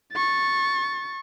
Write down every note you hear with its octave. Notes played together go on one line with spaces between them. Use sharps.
C#6 A6